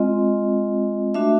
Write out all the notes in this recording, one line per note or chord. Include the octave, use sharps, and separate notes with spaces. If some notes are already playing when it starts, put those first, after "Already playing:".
Already playing: G#3 C4 F4 D#5
A3 D4 F#4 E5